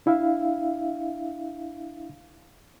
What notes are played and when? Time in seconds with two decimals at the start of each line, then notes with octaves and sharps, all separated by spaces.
0.06 D4 E4 E5 F5